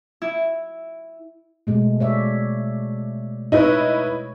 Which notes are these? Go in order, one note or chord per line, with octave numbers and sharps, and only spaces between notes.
E4
B2 G#3 A3
C#5 D5 E5
D#4 E4 B4 C#5